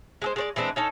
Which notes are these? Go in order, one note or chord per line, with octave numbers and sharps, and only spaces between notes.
G#3 G#4 C5
G#3 C5 D5
E3 G#3 C4 D4
C#4 D#4 A4